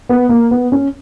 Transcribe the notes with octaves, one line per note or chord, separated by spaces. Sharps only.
B3
A#3
B3
C#4